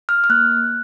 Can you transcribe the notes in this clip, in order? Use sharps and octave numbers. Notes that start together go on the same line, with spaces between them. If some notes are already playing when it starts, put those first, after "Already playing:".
F6
F6
A#3 F#6